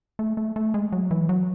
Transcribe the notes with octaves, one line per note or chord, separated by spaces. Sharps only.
A3
A3
A3
G#3
F#3
E3
F#3